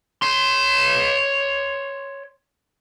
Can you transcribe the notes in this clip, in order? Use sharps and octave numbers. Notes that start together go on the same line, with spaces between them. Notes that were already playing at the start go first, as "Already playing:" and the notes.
C#5 C6